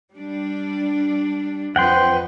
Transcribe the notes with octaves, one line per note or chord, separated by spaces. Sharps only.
G3 D4
F2 F3 B4 F#5 G5 C6